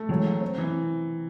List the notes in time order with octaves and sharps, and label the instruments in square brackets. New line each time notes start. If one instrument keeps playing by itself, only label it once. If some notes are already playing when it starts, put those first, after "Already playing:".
Already playing: [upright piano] A3
[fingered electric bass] E3 G#3 [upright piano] F#3
[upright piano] F#3
C4
E3